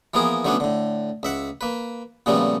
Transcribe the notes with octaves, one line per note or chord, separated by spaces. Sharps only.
E3 F3 A#3 B3 G#4 A#4
D3 F#3 A3 B3 C#4 D4
A2 D3
C#2 E5 F#5
A#3 B4
A#2 C#3 F3 G3 A3 B3